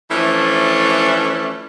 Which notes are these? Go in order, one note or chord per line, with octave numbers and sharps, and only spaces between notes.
E3 F3 A3 C#4 D4